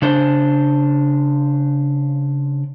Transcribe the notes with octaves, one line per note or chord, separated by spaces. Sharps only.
C#3 D4 C5